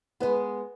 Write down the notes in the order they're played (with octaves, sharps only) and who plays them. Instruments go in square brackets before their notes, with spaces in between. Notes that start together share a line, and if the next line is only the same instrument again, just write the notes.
[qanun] G#3 B3 [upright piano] B4